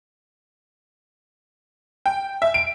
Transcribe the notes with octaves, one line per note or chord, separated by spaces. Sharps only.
G5
E5
D7